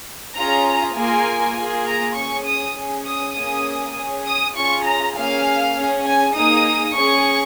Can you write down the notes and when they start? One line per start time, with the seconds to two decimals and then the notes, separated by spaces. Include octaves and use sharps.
0.35 C#4 F4 G#4 A#5
0.95 A#3 F4 G#4 G#5
1.56 A#3 F4 G#4
1.86 A#5
2.16 C#4 G#4 C#6
2.45 D#6
2.75 C#4 G#4
3.06 D#6
3.35 A#3 C#4 G#4 D#6
3.95 C#4 G#4
4.26 D#6
4.55 C#4 F4 G#4 C#6
4.85 A#5
5.15 A#3 C#4 G#4 F5
5.75 C#4 G#4
6.05 G#5
6.35 A#3 D#4 G#4 D#6
6.95 C#4 G#4 C#6